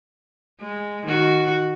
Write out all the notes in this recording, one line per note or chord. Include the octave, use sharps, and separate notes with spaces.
G#3
D#3 F#4